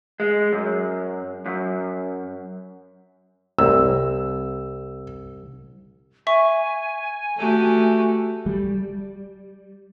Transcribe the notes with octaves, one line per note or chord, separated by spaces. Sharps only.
G#3
F#2
F#2
C2 E6
E5 G#5 C#6
A3 F#4 G4
G3